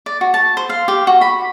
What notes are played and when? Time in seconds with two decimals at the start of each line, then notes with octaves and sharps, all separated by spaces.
0.06 D5
0.21 F#4
0.34 A5
0.57 C5
0.69 F5
0.88 G4
1.07 F#4
1.21 B5